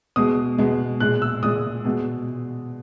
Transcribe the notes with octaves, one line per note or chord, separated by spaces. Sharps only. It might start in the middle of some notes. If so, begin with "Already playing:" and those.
B2 G#3 D#6
B2 G#3
A#2 G#3 F#6
E6
A#2 G#3 D#6
B2 G#3